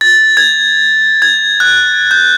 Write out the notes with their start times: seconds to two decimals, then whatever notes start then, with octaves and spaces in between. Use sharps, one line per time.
0.01 A6
0.37 G#6
1.22 G#6
1.60 F#6
2.11 G6